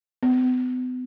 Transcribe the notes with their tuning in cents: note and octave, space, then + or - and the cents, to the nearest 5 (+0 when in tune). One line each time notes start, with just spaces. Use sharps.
B3 +40